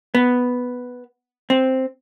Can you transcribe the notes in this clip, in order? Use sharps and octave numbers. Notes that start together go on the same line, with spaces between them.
B3
C4